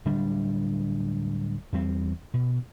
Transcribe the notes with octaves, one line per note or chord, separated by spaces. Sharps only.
D1 D3 G3 D4
E2 G3 C4
B2